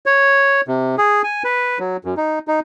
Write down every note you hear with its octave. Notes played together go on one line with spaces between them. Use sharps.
C#5
C3
G#4
G#5
B4
F#3
F#2
D#4
D#4